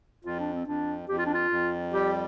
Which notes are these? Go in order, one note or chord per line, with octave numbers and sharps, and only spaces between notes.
F2 F4
D4
C4
F2 D4
F2 G4
F4
D4
F4
F2
G3 G4